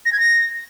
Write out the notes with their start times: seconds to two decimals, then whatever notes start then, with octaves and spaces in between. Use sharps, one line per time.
0.06 A#6
0.12 G#6
0.19 A#6